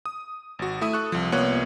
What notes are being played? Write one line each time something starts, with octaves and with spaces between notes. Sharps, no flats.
D#6
G#1 F#4
A3 E4 E5 D#6 D#7
A4 C#6 F#6
C2 F3
C2 A#3 B3 F4 C#5 F#6